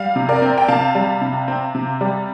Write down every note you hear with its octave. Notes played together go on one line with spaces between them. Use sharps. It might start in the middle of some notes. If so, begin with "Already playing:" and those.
Already playing: G3 F5
C3
A#4 D5
C4
G5
C3 F5 A5
G3
C3
C4
C3
G3